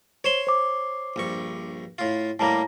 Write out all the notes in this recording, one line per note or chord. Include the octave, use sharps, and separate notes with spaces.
C5 C#5 C6 E7 G7
C5 D6
A#1 G2 C#6
A2 F4
A2 G3 A#3 A5 A#5 A#6